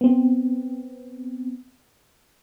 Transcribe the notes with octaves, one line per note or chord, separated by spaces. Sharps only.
B3 C4